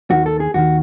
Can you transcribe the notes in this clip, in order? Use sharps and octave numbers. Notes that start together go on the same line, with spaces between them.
D#2 D#3 F#4
A4
G#4
D#2 D#3 F#4